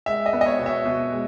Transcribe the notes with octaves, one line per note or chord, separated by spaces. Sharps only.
G#3 E5
D#5
B3
D#5
C#5
B2
E5
B2
G#3